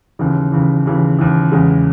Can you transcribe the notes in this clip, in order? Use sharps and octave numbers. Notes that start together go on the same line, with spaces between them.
D#2 C#3 E3
D#2 C#3 E3
D#2 C#3 E3
D#2 C#3 E3
E2 C#3 G#3